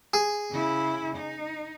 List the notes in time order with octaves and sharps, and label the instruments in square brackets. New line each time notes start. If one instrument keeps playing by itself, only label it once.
[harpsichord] G#4
[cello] C#3 E4
D#4